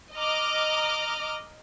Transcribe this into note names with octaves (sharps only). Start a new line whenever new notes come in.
D#5 A#5 D6 F6